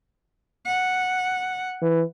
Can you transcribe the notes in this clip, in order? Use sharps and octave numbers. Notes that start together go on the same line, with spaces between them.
F#5
E3